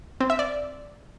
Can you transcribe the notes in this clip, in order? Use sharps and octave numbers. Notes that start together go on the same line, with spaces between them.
C4
E5
D5